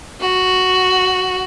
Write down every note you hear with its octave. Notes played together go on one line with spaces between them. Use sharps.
F#4